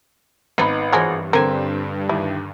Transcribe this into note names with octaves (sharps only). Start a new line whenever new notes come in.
G#1 B3 D#4 B5
G2 E3 F3 G#3 F#4 A#4 C#5
D3 C4 A#4 G#5
D#2 E4